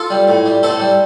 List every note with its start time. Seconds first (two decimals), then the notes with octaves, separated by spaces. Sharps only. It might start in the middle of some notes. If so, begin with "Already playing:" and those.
Already playing: F4 A4
0.10 G3
0.28 A2
0.46 G3
0.63 A2 A4 C5
0.80 G3